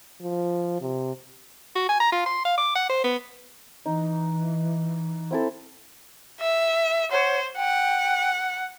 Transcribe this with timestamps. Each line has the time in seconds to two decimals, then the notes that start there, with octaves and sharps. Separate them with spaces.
0.22 F3
0.82 C3
1.75 F#4
1.89 G#5
2.00 A#5
2.12 F4
2.26 C6
2.45 F5
2.58 D6
2.75 F#5
2.89 C5
3.04 B3
3.86 E3 D#4
5.31 C4 E4 A4
6.40 E5
7.12 C5 C#5 F#5
7.57 F#5 G5